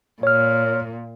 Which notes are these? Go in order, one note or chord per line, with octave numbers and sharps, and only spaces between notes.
A#2 C#5 F6